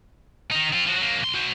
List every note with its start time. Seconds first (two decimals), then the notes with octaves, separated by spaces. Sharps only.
0.52 D#3 D#4
0.73 C4 F4
0.86 F3 F#4
0.98 F#3 A#3
1.21 B1 C6
1.34 F#4 C5